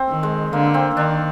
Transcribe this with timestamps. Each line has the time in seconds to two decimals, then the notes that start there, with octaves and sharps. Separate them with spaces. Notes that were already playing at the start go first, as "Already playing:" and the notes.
Already playing: C4
0.09 D#3
0.23 G#3
0.53 D3 A#3
0.74 C4
0.96 D#3 D4